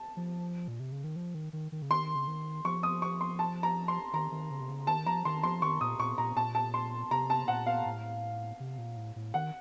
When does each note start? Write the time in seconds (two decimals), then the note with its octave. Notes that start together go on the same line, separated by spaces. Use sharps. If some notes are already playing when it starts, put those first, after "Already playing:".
Already playing: A5
0.17 F3
0.68 A#2
0.80 C3
0.92 C#3
1.04 D#3
1.16 F3
1.35 D#3
1.53 D#3
1.72 D#3
1.82 C#3
1.90 D#3 C6
2.15 C#3
2.27 D#3
2.65 F3 C#6
2.83 D#6
3.02 C#6
3.21 C6
3.39 A5
3.63 A#5
3.88 C6
4.13 D#3 A#5
4.32 D#3
4.51 C#3
4.61 C3
4.69 C#3
4.87 D#3 A5
5.06 F3 A#5
5.25 D#3 C6
5.43 F3 C6
5.62 D#3 C#6
5.81 A#2 D#6
5.99 A#2 C#6
6.18 A#2 A#5
6.37 A#2 A5
6.55 A5
6.74 C6
7.11 C3 A#5
7.30 A5
7.48 A#2 F#5
7.66 F5
7.86 A2
8.60 C3
8.78 A#2
8.97 A2
9.16 A2
9.34 D#3 F#5